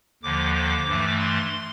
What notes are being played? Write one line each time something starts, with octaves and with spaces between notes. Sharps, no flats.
D#2 D3 F3 D6
D6
G2 E3 A3
C6